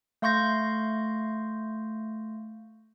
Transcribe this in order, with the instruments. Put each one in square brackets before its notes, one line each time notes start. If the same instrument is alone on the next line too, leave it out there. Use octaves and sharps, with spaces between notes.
[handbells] A3 F5 C6 C#6 G6 A#6